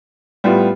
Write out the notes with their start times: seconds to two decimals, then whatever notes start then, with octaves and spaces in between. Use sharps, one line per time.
0.44 A2 G3 B3 F4